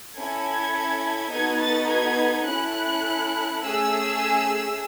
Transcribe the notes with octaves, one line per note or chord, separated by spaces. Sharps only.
C#4 E4 A4 G#6
B3 D#4 F#4 A4 G#6
A6
G#6
C#4 E4 A4 F#6
A3 C#4 G#4 E6